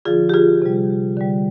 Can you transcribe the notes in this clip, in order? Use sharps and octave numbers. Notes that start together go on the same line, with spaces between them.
D3 F3 F4 G#4
G4
F4 G#4
C3 G3
D3 G3